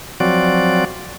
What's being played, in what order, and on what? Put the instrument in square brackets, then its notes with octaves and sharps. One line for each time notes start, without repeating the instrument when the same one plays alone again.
[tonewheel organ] F3 F#3 C4 F#4 D5